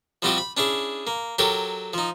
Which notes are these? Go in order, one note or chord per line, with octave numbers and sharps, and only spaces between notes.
F3 G3 C4 F#4 G4 D#5
B5
C#4 D4 E4 G#4
A#3
F#3 G4 A4 A#4 C#5
F3 D#4